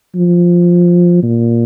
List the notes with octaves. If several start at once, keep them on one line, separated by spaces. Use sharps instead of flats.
F3
A#2